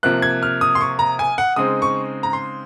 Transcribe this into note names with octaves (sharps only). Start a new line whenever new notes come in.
C3 F3 A#3 F#6
G#6
F6
D#6
C6
C#6
A#5
G#5
F#5
C#3 G#3 C4 D#4 D#6
C#6
A#5
C6